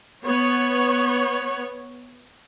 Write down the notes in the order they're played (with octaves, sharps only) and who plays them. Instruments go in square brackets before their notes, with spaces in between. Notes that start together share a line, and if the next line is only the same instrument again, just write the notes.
[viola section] B3 C#5